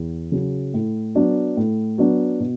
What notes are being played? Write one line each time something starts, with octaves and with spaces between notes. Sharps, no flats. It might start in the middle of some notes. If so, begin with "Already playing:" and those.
Already playing: E2
C#3 F#3
A2
F#3 B3 D4
A2
F#3 B3 D4
B2